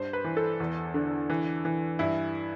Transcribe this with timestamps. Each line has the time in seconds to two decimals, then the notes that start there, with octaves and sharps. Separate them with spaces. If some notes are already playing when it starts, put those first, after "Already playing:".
Already playing: G2 C5
0.13 B4
0.25 E3
0.37 A4
0.60 E2
0.94 D3
1.30 E3
1.65 E3
1.99 G2 E4